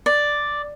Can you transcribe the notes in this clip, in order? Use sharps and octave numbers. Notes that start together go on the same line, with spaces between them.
D5